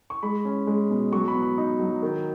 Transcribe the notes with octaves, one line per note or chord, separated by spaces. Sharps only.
C#6
G#3 B5
C#4
G#3
B2
F#3 C#6
B5
B3
B5
D#4
F#3
D#3